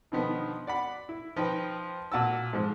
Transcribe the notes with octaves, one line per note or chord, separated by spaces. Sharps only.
B2 D3 D#3 F3 B3
D5 F#5 B5
E4
F3 D#4 B4 G5
A#2 F#4 A5 E6
G#2 F3